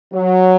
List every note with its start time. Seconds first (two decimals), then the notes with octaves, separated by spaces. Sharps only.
0.13 F#3